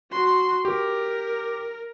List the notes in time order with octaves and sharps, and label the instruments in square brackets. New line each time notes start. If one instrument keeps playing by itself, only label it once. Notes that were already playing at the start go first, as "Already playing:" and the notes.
[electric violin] F#4 C6
[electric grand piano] G4 [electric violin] A#4